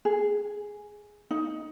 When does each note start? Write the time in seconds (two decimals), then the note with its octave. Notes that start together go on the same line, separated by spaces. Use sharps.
0.05 G#4
1.31 D#4